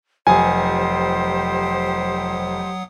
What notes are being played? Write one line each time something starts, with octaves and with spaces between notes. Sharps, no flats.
F1 F#3 G4 C5 F#5 G#5 D#6